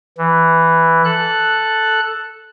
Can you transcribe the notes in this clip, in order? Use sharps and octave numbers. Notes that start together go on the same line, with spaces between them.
E3
A4 F#6